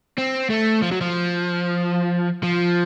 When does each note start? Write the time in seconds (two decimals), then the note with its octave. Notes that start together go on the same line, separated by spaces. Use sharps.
0.18 C4
0.50 A3
0.82 F3
0.91 F#3
1.01 F3
2.43 F3